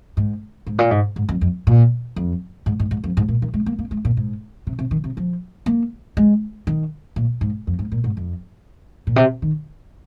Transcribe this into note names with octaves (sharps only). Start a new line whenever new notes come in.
G#2
G#2
A#2
G#2
G#2
F2
F2
A#2
F2
G#2
G#2
G#2
F2
G#2
A#2
D#3
G#3
A#3
A#3
G#3
A#2
G#2
C3
C3
D#3
C3
F3
A#3
G#3
D#3
A#2
G#2
F2
G#2
A#2
G#2
F2
A#2
C3
D#3